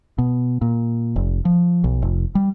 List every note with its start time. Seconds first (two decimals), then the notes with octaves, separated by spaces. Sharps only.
0.18 B2
0.62 A#2
1.16 F1
1.45 F3
1.84 B1
2.02 F1
2.35 G3